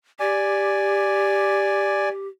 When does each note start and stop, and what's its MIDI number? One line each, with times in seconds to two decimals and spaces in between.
0.20 2.28 67
0.20 2.09 74
0.20 2.09 80